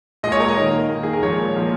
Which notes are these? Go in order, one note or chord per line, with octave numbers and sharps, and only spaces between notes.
A#2 G#3 D#5
C#5
A#4
D#5
D#3 A#3
D#3 A#3
G#4
A#4
A#2 F3 G#3 C#5
A#2 F3 A#3